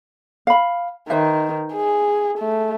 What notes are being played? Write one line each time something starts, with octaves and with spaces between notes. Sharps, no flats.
F5 B5
D#3 B4 C5 E5
G#4
A3